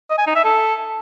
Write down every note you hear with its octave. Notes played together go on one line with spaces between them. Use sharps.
D#5
G#5
D#4
E5
A4